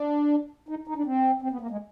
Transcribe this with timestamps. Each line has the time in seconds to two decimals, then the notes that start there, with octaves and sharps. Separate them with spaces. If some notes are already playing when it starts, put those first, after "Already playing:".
Already playing: D4
0.69 D#4
0.87 D#4
0.96 D4
1.06 C4
1.42 C4
1.51 B3
1.61 A#3
1.70 G#3